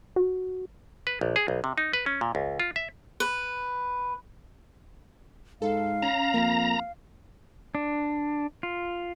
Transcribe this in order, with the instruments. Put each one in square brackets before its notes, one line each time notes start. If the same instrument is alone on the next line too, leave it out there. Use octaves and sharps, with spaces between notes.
[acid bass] F#4
[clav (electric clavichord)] B4
A#1
G#4
B1
C3
D#4
B4
C#4
A#2
C#2
F4
E5
[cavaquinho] B4
[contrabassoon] G#2 [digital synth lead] A4 [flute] F5
[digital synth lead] C#4 [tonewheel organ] A#5
[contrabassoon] F2 [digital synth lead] A#3
[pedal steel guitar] D4
F4